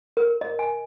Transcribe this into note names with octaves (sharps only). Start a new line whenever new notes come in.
A#4
D#5
G#5